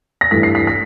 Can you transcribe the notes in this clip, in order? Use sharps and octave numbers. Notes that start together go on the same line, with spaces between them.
A#6
G2 E3 A3 B6
C7
B6
B6